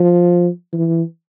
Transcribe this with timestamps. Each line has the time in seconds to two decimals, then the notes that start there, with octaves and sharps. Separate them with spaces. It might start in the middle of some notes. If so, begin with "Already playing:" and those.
Already playing: F3
0.73 E3